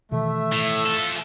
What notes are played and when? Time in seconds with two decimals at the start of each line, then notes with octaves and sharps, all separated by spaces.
0.11 B2 D#3 E3 A3 E5
0.52 A2
0.85 F3 A4